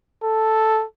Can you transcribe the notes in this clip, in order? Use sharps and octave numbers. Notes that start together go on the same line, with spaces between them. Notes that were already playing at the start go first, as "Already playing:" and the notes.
A4